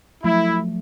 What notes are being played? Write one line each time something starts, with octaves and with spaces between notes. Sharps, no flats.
F3 F#3 A3 E4